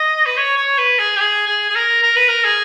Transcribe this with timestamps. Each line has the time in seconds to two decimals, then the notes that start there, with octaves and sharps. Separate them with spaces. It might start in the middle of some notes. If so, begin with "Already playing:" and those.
Already playing: D#5
0.26 B4
0.37 C#5
0.57 C#5
0.78 B4
0.99 G#4
1.16 G4
1.20 G#4
1.48 G#4
1.70 G#4
1.75 A#4
2.03 A#4
2.16 B4
2.28 A#4
2.44 G#4